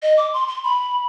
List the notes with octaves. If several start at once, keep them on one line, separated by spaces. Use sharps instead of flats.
D#5
D6
C6
C6
B5